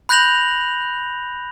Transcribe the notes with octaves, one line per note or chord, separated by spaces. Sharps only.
B5 F#6 G6 A#6 F7 F#7